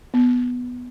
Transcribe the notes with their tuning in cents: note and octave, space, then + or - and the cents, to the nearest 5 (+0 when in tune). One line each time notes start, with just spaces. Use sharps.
B3 +0